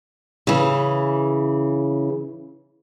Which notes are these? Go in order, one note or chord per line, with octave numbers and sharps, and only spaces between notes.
C#3 E3